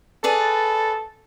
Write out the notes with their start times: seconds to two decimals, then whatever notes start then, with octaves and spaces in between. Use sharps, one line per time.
0.24 G#4 A4 B4 D5